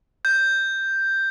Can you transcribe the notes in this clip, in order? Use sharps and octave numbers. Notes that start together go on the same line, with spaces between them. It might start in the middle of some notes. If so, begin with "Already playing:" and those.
G6